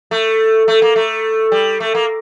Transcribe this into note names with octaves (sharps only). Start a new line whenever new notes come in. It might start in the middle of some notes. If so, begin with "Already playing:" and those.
A3
A3
A#3
A3
G3
A3
A#3